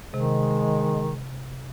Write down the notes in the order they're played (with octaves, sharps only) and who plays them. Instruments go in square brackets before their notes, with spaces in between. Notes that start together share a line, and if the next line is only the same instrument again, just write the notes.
[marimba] C3 [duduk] D#3 [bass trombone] G#3